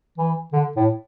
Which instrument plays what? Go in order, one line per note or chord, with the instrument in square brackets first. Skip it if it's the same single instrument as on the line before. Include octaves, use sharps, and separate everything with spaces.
[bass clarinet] E3
D3
A2